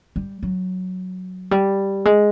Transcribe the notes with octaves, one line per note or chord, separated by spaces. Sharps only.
G3
F#3
G3
G#3